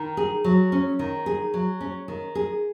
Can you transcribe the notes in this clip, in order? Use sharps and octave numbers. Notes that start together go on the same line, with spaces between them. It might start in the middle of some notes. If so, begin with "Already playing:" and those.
Already playing: D#3
G#4
F#3
C#4
D#3
G#4
F#3
C#4
D#3
G#4